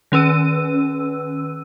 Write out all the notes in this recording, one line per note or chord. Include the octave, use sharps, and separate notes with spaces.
D#3 C#4 B4 E6 D#7